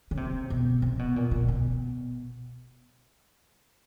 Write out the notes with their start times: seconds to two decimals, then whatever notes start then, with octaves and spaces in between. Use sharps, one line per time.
0.11 C#3
0.17 C3
0.50 B2
0.82 C3
0.99 B2
1.16 A#2
1.31 A#2
1.48 B2